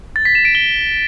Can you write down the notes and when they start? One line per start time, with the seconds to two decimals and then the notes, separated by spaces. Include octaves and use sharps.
0.16 A6
0.25 B6
0.35 E7
0.45 D7
0.55 G7